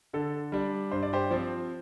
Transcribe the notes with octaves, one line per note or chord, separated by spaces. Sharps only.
D3 A4
G3 D4
G2 C5
D5
G4 C5
F3 C4